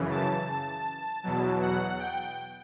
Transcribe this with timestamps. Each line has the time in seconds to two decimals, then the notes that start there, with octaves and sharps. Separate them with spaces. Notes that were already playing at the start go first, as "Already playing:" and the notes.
Already playing: F#2 C#3 E3
0.11 A5
0.48 A5
1.23 E2 B2 F#3
1.62 F#5
1.99 G5